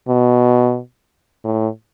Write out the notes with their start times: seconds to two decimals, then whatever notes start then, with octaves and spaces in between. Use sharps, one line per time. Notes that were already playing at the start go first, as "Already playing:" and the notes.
0.08 B2
1.44 A2